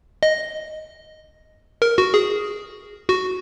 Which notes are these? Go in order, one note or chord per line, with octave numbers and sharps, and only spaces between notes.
D#5
A#4
F#4
G#4
F#4